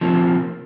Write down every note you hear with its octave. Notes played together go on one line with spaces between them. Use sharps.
C3 F3 A#3